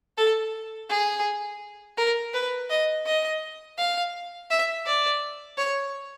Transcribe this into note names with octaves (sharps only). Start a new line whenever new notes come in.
A4
G#4
A#4
B4
D#5
D#5
F5
E5
D5
C#5